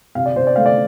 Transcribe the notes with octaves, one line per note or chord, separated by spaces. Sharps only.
C3 F5
D5
C3 C5
D5
A3 F5
D5